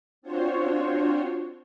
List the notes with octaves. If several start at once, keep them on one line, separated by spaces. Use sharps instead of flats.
C4 D4 F4 F#4 C5 C#5